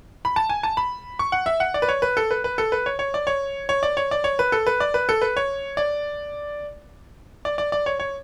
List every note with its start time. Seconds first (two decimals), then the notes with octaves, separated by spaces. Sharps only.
0.25 B5
0.36 A5
0.49 G#5
0.63 A5
0.77 B5
1.19 C#6
1.32 F#5
1.46 E5
1.60 F#5
1.74 D5
1.82 B4
1.89 C#5
2.02 B4
2.17 A4
2.31 B4
2.44 B4
2.58 A4
2.72 B4
2.86 C#5
2.99 C#5
3.14 D5
3.27 C#5
3.69 C#5
3.83 D5
3.97 C#5
4.11 D5
4.24 C#5
4.39 B4
4.52 A4
4.67 B4
4.80 D5
4.94 B4
5.09 A4
5.22 B4
5.37 C#5
5.77 D5
7.45 D5
7.58 D5
7.72 D5
7.86 C#5
8.00 C#5